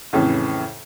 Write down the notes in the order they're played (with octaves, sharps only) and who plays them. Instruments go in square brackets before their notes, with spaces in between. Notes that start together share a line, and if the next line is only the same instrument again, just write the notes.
[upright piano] F2 A2 C#3 E3